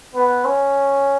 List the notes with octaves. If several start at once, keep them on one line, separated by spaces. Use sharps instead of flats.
B3
C#4